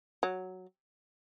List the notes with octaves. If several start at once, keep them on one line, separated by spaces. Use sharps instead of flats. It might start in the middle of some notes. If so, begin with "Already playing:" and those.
F#3